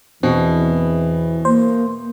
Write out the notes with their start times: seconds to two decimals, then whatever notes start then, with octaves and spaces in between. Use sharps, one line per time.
0.23 E2 B2 E3 C4
1.45 A#3 C5